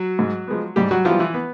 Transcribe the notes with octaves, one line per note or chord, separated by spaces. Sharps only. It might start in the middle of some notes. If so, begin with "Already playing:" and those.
Already playing: F#3 F#4
G#2
F3 G#3 B3
G#2 G3 G4
F#3 F#4
E3 F3 G3 B3 F4
E3 E4
B3